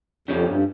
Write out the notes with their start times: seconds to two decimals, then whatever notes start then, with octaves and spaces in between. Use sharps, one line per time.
0.28 F2 C#3 F3 C#4 G4
0.47 G2